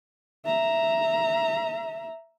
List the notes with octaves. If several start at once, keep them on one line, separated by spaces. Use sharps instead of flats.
E5 A#5